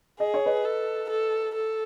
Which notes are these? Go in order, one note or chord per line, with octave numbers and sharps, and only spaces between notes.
G#4 D#5
C#5
B4 D#5
A4
A4
A4